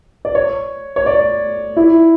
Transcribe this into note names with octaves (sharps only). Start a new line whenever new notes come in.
D5
C#5
C#5
D5
E4